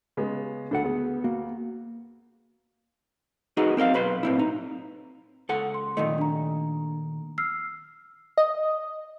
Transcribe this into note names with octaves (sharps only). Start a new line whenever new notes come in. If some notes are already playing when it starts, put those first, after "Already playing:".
C#3 G#3 B3
D2 D4 A4 F#5
B3 G#4
A#3 F#4
D#4 F#4 G#4 B4
C4 A#4 D#5 F5
B1 B4 C6
A2 C4 E4
D#4
C#2 A4 F#5
C6
A#2 D#3 A3 D#5
D4 A#5
E6 F6 C7
D#5